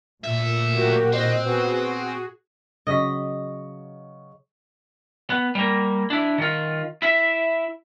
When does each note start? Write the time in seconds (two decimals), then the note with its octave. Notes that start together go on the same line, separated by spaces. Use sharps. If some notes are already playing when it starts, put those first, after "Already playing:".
0.24 D2 A#2 E5
0.74 F#3 A#3 F#4 G4 A#4
1.13 D#3 C4 D#5 F#6
1.45 B3 F#4 G#4 B4
2.87 C#3 F#3 D#5 C#6 B6
5.30 B3
5.55 G3 A#3
6.10 D4 E4
6.38 D#3 F4
7.02 E4 E5